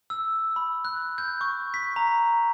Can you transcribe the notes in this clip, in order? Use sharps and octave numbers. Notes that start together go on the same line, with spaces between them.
E6
B5
F#6
G6
C#6
B6
A#5